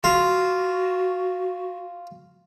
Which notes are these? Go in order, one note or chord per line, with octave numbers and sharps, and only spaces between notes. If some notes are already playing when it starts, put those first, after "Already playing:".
F4 F#4